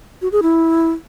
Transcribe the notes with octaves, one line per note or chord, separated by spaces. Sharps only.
F#4
G#4
E4